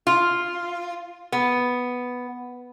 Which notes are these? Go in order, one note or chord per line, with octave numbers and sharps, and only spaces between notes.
F4
B3